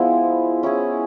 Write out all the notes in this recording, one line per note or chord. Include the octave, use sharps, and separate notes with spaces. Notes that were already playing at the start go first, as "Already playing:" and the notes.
Already playing: F3 G#3 B3 E4
C#4 E4 G#4